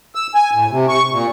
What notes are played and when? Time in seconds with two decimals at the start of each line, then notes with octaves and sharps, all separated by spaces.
0.15 E6
0.34 G#5
0.53 A2
0.71 C3
0.89 C#6
1.12 A#2